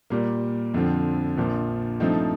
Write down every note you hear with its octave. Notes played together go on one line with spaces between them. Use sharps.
A#2 G3 A#3
F2 D3 F3 C4
A#1 A#2 F3
G2 F3 A3 C4 D#4